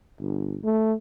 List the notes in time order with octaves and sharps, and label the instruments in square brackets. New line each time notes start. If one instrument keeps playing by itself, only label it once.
[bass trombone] G1
A3